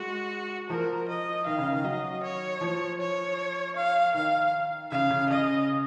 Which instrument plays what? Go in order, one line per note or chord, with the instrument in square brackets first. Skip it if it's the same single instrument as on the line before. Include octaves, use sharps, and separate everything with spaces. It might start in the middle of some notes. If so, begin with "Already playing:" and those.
Already playing: [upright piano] G#3 [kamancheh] F#4
[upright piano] F3 [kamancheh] A#4
[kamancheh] D#5
[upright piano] D#3 [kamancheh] F5
[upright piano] C#3
D#3
[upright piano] F#3 [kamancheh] D#5
[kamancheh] C#5
[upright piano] F3
[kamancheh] C#5
F5
[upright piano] D#3 [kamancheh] F5
[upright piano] C#3 [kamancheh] F5
[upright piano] C#3
[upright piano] C#3 [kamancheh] D#5